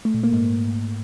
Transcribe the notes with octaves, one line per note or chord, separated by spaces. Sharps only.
A3
A#2
A#3
G#2